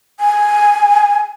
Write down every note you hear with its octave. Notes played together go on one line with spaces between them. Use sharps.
G#5